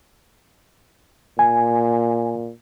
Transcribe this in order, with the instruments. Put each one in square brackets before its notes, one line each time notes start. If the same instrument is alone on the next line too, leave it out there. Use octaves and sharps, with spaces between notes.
[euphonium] A#2 [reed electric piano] G#5